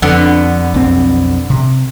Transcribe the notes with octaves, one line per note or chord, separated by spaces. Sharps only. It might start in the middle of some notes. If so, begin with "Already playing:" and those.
F2 D3 B3
B1 F2 C4
C3